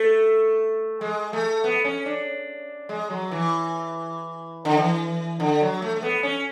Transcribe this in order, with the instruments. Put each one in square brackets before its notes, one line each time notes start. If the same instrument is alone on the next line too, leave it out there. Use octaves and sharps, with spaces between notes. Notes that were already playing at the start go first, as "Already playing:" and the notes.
Already playing: [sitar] A3
G#3
A3
B3
C#4
D4
G#3
F#3
E3
D3
E3
D3
F#3
A3
A3
B3
C#4